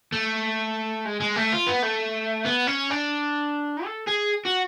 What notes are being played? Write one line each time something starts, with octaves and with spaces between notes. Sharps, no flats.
A3
G#3
G#3
A3
F4
B3
A3
B3
C#4
D4
A4
G#4
F#4